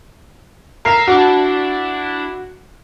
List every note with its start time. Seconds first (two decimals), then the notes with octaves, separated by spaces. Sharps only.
0.85 A#4 E5 F5 C7
1.07 D4 E4 F#4